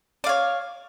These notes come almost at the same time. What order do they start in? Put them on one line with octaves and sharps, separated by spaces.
D5 F5 C#5